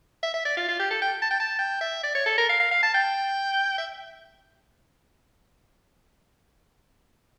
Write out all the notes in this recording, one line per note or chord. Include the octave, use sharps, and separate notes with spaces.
E5
E5
D5
F4
F4
G4
A4
G5
A5
G5
A5
G5
E5
D5
C#5
A4
A#4
F5
F5
F5
A5
G5
E5